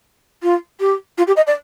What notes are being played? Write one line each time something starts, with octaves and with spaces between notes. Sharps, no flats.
F4
G4
F4
G4
D#5
D5